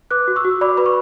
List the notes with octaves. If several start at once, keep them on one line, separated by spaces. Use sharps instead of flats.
B4 D6 F#6
F#4
C#6 E6
F#4
D5 B5 D6
B4 B5
C#6